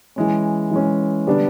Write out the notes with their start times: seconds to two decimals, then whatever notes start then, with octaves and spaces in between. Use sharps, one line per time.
0.16 E3 G#3 C#4
0.71 E3 G#3 C#4
1.27 D3 G3 B3 D4